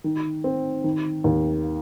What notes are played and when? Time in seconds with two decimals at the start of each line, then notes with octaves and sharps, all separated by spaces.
0.04 D#3
0.44 C4
0.84 D#3
1.24 D#2